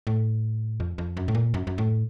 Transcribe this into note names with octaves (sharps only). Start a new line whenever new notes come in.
A2
F2
F2
F#2
A2
A#2
F#2
F#2
A2